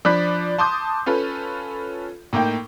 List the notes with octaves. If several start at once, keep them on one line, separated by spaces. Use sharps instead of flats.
F3 D4 D5 B5 F#6 B6
A5 C6 D6 D#6 G6
C#4 F4 A4 B4
A2 A#3 D#4 G5